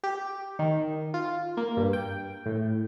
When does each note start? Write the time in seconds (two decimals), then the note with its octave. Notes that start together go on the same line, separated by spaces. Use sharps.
0.04 G4
0.59 D#3
1.14 F4
1.57 A#3
1.77 G2
1.93 G5
2.46 A2